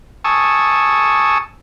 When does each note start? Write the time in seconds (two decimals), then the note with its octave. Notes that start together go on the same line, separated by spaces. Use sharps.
0.24 G#5 A5 C#6 D#6 E6